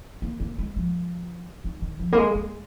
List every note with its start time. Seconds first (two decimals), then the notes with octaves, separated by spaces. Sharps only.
0.22 A#3
0.40 A#3
0.58 G#3
0.76 F3
1.65 D#3
1.82 D#3
2.00 F3
2.12 A#3
2.17 G#3
2.35 A#3